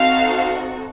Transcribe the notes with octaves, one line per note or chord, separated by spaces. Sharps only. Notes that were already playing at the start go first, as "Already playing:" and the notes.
Already playing: C4 D#4 F#4 A4 F5